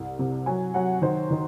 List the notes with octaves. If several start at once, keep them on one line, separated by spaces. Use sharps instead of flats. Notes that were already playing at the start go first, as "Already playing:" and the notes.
Already playing: C2
C3
F#3 G#5
F#3 F#5
D#3 C5
D#3